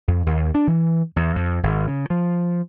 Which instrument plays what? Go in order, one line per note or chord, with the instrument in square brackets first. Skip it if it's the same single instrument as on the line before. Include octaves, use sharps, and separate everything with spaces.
[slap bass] F2
D#2
D4
E3
E2
F2
G#1
C#3
F3